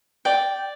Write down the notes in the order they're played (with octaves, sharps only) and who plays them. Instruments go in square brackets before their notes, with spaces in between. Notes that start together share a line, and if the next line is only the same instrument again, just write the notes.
[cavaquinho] D5 G5